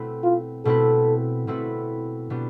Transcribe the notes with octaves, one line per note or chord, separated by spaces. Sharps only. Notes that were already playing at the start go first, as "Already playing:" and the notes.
Already playing: B2 A3 C4 E4 B4
F4
B2 A3 C4 E4 A4 B4
B2 A3 C4 E4 B4
B2 B3 D4 G4